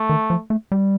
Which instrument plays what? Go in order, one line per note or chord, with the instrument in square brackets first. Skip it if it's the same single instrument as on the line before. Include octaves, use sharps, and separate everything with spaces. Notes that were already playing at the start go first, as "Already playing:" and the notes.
Already playing: [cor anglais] A3
[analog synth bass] D#3
F3
A3
G3